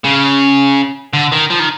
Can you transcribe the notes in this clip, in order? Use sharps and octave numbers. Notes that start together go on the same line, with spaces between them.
C#3
D3
D#3
F3
D#3